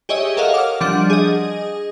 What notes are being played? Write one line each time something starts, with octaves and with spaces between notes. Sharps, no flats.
G4 G#4 C#5 D#5 E5
A4 A#4 C#5 D#5 F5 F#5
D6 F6
F3 G3 D4 F#5 G6
G#4 D#5